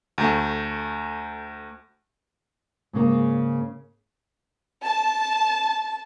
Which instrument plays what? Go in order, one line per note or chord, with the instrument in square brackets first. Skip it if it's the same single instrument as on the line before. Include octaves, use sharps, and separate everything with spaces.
[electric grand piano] D2 A3
[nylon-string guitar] G#2 C#3 A#3
[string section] A5